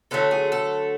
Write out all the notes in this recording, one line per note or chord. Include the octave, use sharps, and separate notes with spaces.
D3 F#3 A3 A4
G#4
A4